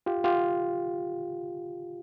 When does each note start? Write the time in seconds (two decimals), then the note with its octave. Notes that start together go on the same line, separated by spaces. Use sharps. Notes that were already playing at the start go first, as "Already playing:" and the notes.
0.06 F4 G4
0.24 F4 G4